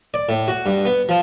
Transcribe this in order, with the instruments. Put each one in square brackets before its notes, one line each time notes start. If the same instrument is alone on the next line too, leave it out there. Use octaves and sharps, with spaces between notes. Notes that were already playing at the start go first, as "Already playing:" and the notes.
[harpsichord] D5
A2
F#4
G2
B3
F3